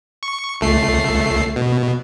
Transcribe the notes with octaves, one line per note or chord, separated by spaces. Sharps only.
C#6
C#2 A3 C7
B2